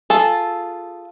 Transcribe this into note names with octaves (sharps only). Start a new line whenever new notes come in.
F4 G#4 A4